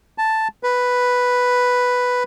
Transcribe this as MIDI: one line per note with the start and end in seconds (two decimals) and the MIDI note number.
0.18 0.48 81
0.63 2.23 71